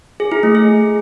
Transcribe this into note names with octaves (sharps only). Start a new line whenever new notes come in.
G#4
E4
A3
G#4